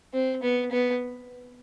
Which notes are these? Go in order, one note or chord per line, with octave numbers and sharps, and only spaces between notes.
C4
B3
B3